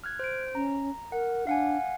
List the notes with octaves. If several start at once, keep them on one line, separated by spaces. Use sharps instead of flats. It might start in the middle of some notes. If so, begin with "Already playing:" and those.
F6 F#6 G#6
C5 D7
C#4 A#5
A#4 F#5
D4 F5 F#5 G#5